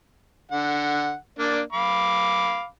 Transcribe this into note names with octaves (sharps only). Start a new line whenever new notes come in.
D3 F#5
A#3 D4 D5
F5 B5 D6